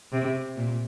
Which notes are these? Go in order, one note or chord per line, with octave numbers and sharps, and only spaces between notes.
C3
A#2